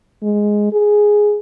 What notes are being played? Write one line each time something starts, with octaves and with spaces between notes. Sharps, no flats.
G#3
G#4